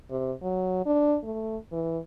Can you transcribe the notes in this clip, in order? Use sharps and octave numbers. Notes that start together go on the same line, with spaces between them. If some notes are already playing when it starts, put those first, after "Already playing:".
C3
F#3
D4
A3
E3